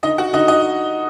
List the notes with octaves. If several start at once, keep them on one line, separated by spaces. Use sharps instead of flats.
D3 D#4 D#5
F#4 F#5
D3 D#4 D#5
D#4 D#5